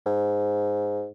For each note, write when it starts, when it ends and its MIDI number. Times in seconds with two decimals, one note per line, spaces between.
0.06 1.09 44